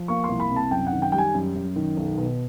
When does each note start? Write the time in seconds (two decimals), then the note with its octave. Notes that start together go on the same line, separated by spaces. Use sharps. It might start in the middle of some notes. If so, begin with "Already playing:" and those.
Already playing: F3
0.08 A#3 C#6
0.24 C6
0.29 C2
0.40 B5
0.50 C3
0.56 A5
0.71 F#2 G5
0.87 F#5
0.92 D#3
1.02 G5
1.12 G3 G5
1.18 G#5
1.34 F#2
1.55 F#2
1.76 D#3
1.97 B1
2.18 B2